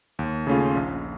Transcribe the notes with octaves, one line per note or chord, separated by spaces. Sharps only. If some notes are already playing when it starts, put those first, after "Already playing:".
D#2
C#3 A3 C#4 F4
A#1